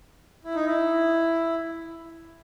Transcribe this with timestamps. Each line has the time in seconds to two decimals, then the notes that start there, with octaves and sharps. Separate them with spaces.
0.44 E4
0.55 D#4
0.65 E4